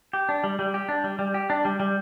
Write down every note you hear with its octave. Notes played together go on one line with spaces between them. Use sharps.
G4
D4
G3
G3
G4
D4
G3
G3
G4
D4
G3
G3